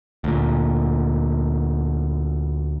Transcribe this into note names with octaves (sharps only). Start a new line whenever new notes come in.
D2 A#2